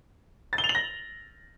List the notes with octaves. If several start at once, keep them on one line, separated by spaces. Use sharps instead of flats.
A6
G7
F7
F#7
A#6